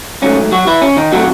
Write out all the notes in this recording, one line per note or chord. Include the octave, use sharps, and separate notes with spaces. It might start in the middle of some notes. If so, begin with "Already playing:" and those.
G#2 D#3 F#3 A3 C#4
F#3 F#4
E3 E4
C#4
D#3 D#4
C3 D#3 F#3 A3 F#4